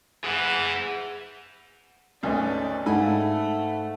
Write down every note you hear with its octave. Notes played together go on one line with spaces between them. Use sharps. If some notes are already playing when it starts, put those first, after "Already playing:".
E3 G#4 F#5
G#1 D2 C#4 B4 D5 D#5
G#2 A3 A4 F5 F#5 G#5 B5